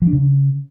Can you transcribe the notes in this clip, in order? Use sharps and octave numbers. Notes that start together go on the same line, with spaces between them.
F3
D4
C#3